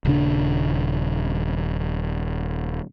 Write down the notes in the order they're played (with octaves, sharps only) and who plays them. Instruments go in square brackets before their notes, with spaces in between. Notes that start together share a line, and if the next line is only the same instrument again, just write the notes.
[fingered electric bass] D#1 C#3 D4